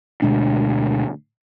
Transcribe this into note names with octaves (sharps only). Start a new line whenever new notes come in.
D2 B2 G#3 D4